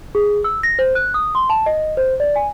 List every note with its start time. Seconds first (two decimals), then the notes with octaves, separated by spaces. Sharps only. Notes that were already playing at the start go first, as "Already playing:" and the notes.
0.15 G#4
0.44 E6
0.63 A#6
0.79 C5
0.95 F#6
1.14 D#6
1.35 C6
1.50 A5
1.66 D#5
1.97 C5
2.20 D5
2.36 G#5